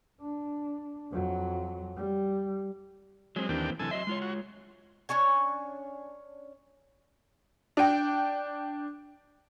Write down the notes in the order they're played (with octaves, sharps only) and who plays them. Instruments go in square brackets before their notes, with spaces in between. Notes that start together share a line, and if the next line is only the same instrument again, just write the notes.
[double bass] D4
F2 F#3
G3
[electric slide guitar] F#3 C4 [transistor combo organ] G#3
[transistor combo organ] D#2 D4 G4 [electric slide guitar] E3 A#3 C4
[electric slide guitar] F#2 C3 E3 [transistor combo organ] A4 G#5
[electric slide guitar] F#3 D#5 E5 [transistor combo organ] C6
[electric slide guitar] G#3 F4 C#5
[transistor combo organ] F#4
[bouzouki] C#4 D4 C#5 G#5
[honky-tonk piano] D4 G5